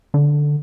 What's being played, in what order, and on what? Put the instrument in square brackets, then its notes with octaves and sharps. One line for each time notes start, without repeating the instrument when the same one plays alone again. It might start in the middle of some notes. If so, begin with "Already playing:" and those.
[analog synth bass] D3